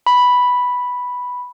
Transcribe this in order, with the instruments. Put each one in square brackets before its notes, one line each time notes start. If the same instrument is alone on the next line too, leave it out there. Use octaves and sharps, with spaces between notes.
[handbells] B5